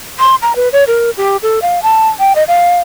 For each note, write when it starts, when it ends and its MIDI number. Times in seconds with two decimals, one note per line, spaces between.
0.19 0.35 84
0.42 0.55 82
0.56 0.69 71
0.73 0.84 73
0.87 1.10 70
1.17 1.37 67
1.43 1.59 69
1.62 1.80 77
1.83 2.08 81
2.19 2.33 79
2.36 2.44 75
2.48 2.79 77